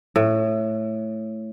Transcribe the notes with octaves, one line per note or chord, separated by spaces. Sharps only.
A2